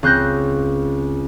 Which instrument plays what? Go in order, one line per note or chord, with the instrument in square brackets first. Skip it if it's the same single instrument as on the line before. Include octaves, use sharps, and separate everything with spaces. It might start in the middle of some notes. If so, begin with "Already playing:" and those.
[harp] C#2 C4 F#6 G6 A#6